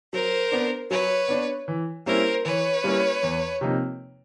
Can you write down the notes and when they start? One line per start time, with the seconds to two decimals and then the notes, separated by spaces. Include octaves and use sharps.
0.13 F#3 A#4 C5
0.52 B3 D4
0.90 F#3 B4 C#5
1.28 B3 D4
1.68 E3
2.06 G3 A#3 C#4 E4 A#4 C5
2.44 E3 B4 C#5
2.84 G3 A#3 C#4 E4
3.23 E2
3.61 C3 F3 A#3 D#4